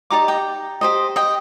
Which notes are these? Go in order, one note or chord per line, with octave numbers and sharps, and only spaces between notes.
D#4 G4 D5 A#5 D6
G5 A#5
G4 C5 D#5
D#5 G5